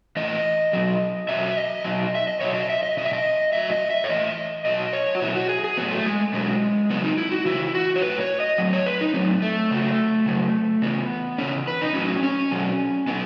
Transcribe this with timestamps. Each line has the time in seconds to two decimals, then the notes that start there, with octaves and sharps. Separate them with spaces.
0.16 A2 E3 D#5
0.73 B2 F#3
1.29 B2 F#3 E5
1.57 D#5
1.84 B2 F#3
2.15 E5
2.28 D#5
2.41 B2 F#3 C#5
2.54 D#5
2.70 E5
2.83 D#5
2.97 B2 F#3 D#5
3.05 E5
3.13 D#5
3.53 A2 F#3 E5
3.72 D#5
3.90 E5
4.04 C#5
4.09 A2 E3 D#5
4.65 B2 F#3 D#5
4.93 C#5
5.15 F#4
5.22 B2 F#3 E4
5.36 F#4
5.49 G#4
5.64 G#4
5.77 A2 F#3 B3
5.91 A3
6.06 G#3
6.34 B2 F#3 G#3
6.90 C#3 F#3 B3
7.04 D#4
7.18 E4
7.31 F#4
7.46 C#3 E3 E4
7.75 F#4
7.96 C#5
8.02 A2 F#3 B4
8.20 C#5
8.40 D#5
8.58 A2 F#3
8.73 C#5
8.86 B4
9.01 D#4
9.14 F#3 C#4
9.19 A2
9.42 A3
9.71 C#3 F#3
10.26 C#3 F#3
10.82 C#3 E3 B3
11.38 C#3 E3 C#4
11.68 B4
11.82 D#4
11.94 A2 F#3 C#4
12.23 C#4
12.51 B2 F#3
13.07 B2 F#3 B3